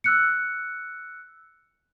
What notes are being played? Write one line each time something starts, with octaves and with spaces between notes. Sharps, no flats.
E6 F#6 C#7